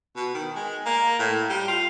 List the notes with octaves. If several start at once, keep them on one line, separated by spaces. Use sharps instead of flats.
B2
D#3
G#3
A#3
A2
G3
F4